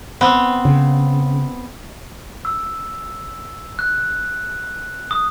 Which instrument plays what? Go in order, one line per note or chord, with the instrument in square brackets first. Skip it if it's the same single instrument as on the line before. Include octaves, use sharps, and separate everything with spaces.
[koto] B3 C4
[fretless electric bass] C#3
[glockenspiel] E6
F#6
D#6